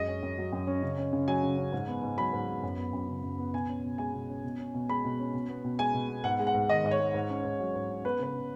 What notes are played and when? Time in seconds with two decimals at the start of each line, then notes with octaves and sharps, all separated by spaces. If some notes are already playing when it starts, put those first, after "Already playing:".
Already playing: F#2 G#3 D#5
0.08 C#4
0.22 F#2
0.38 F#3
0.52 F#2
0.67 C#4
0.83 C#3
0.98 C#4
1.13 C#3
1.28 F#3 G#5
1.43 C#3
1.58 C#4
1.72 G#2
1.87 B3
2.03 G#2
2.18 F#3 B5
2.33 G#2
2.48 B3
2.63 F#2
2.78 B3
2.93 F#2
3.08 C#3
3.24 F#2
3.38 B3
3.53 B2 G#5
3.69 C#4
3.84 B2
3.98 G#3 G#5
4.13 B2
4.29 C#4
4.44 B2
4.59 C#4
4.74 B2
4.89 G#3 B5
5.04 B2
5.20 C#4
5.33 B2
5.48 B3
5.64 B2
5.79 G#3 G#5
5.94 B2
6.09 B3
6.24 G#2 F#5
6.39 G#3
6.47 F#5
6.54 G#2
6.69 D#3 D#5
6.84 G#2 D#5
6.91 C#5
6.99 G#3
7.14 G#2
7.29 C#4
7.44 G#2
7.60 F#3
7.75 G#2
7.90 C#4
8.04 B3 B4
8.19 C#3 B4
8.35 C#3